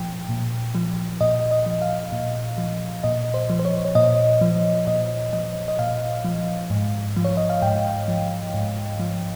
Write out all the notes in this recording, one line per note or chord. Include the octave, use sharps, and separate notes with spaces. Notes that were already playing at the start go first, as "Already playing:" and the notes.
Already playing: A#2 F3 G5
A#2
F3
A#2 D#5
D#5
F3
F5
A#2
F3
A#2 D#5
C5
F3
C5
C#5
C#5
A#2 D#5
F3
A#2 D#5
F3 D#5
D#5
A#2 F5
F3
G#2
F3
C#5
D#5
F5
G#2 G5
F3
G#2
F3